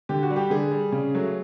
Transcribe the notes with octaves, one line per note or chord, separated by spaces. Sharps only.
D3 G4
F#4
G3
G4
D3 G#4
G3
C#3
F#3 A3